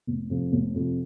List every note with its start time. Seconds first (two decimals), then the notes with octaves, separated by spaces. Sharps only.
0.07 F1
0.30 F2 C3 F3
0.52 F1
0.74 F2 C3 F3